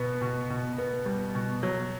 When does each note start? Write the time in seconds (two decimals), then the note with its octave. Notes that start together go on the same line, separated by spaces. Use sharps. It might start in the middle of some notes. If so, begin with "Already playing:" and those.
Already playing: B2 B3
0.21 B2
0.50 B2
0.78 B3
1.06 G3
1.35 B2
1.63 F#3